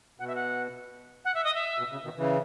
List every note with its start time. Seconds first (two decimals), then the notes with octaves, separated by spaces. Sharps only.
0.19 B2 F#5
0.27 E5
0.35 F#5
1.25 F#5
1.34 E5
1.44 D#5
1.55 E5
1.78 B2
1.91 C#3
2.04 B2 D#3
2.18 C#3 E3